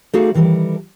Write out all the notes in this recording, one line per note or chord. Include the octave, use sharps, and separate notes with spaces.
A3 D#4 F#4 G#4 D5 F5
D#3 E3 G3 A4 A#4